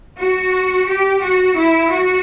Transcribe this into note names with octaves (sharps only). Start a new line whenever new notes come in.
F#4
G4
F#4
E4
F#4